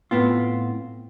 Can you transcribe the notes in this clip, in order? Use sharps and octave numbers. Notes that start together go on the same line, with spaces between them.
A2 B3 C4 F4